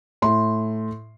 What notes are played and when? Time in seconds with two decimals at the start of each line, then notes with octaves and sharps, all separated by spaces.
0.22 A2 C6